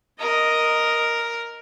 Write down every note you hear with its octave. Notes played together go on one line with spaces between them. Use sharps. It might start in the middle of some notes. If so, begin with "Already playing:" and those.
A#4 D#5